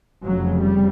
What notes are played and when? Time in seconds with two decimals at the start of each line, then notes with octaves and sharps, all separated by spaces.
0.24 F1 F2 C#3 F#3
0.61 G3